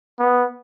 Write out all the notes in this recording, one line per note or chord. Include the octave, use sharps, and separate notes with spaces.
B3